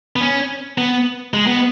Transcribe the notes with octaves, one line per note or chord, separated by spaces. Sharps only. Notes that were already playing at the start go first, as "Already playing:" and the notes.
B3
C#4
B3
G#3
B3